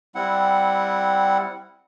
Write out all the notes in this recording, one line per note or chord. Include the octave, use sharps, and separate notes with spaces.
G3 C4 E4 F#5